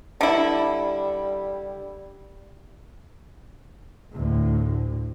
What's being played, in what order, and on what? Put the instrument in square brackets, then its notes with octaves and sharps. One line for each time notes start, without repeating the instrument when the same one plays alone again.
[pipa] D3 E4 [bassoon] G3
[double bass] D2 A2